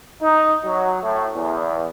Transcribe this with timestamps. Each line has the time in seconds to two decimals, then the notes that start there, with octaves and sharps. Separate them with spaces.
0.21 D#4
0.65 F#3
1.03 A2
1.34 E2